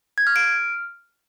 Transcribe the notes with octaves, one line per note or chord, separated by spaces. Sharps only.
G#6
F6
D7
F6